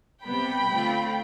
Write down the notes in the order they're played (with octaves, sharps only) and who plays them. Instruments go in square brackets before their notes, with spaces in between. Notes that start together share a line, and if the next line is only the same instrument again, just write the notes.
[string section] C3 G3 B3 [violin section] G5 B5
[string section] D3 A3 C4 F4